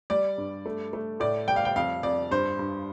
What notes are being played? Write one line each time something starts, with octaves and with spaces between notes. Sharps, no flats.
G3 D5
G2
A3
A3
A2 D5
G3 G5
F5
G5
F2 F5
F2 D5
G2 C5
G2